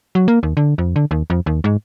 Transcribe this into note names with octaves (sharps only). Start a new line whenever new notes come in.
F#3
A#3
D#2
D3
F2
D3
D#2
F2
D#2
G#2